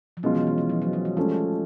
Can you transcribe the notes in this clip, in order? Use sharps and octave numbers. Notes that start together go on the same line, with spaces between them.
F3
B2 F#3 G#3 C#4 F4
E3
E3
E3
F3
F#3
F#3
G3
F3 G#3 A3 C#4